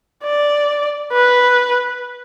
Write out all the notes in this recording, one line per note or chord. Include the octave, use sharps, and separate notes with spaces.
D5
B4